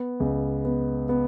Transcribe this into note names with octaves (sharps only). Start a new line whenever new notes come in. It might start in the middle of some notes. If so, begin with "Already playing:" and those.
Already playing: B3
C#2
B3
B3